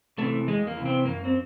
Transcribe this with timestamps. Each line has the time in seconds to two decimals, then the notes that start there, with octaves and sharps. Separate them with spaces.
0.18 C3 E3 A3
0.48 E2 G#3
0.67 A#3
0.77 C3 E3
0.86 C4
1.05 F#2 A#3
1.25 C4